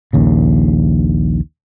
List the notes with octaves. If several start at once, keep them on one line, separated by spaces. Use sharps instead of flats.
A#1 D#2 C#3